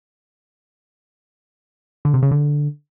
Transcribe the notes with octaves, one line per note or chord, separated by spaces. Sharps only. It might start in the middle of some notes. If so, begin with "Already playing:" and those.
D3
C3
C#3
D3